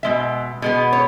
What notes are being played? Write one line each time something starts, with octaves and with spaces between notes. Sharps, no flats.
B2 G#3 E5
B2 G#3 B3
C#5